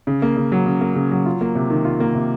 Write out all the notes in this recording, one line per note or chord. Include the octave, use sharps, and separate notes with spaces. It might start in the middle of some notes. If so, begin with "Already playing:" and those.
C#3
A#3
C#3
F#3
C#3
A#3
C#3
F#3
F4
A#3
C3
D#3
F4
A#3
C3